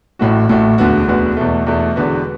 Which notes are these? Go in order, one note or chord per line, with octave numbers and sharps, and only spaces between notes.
A1 A2 A3 F#4
A1 A2 A3 F#4
E1 D2 D3 B3 F#4
E1 D2 D3 B3 F#4
E2 B2 A3
E2 B2 A3
E1 E2 D3 B3 F#4